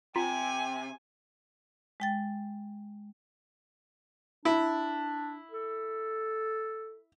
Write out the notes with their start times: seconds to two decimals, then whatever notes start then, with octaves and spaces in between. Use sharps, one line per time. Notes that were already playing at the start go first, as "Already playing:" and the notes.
0.16 C3 F4 G5 G#5 A#5 B6
2.00 G#3 G5 A6
4.45 D4 E4
5.51 A4